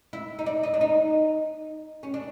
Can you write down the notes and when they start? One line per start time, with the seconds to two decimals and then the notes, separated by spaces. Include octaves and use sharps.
0.13 E4
0.39 D#4
0.46 D4
0.63 D#4
0.74 D4
0.81 D#4
2.03 C#4
2.14 D4